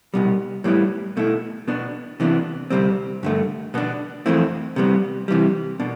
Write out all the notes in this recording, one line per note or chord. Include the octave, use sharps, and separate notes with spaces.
C2 B2 G3
A2 G3 B3 E4
B2 A3 E4
B2 B3 D4
C3 E3 B3 D4
D2 C3 G3 C4
G2 D3 A3
B2 B3 D4
F2 E3 A3 C4 E4
C3 G3 B3
C3 E3 G3
B2 D4